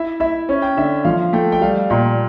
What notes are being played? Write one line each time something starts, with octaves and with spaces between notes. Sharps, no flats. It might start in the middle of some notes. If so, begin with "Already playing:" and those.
Already playing: E4 E5
E4 E5
C#4
G5
D3 E5
F3 F5
A3 G5
G5
G3 F5
A#2 G5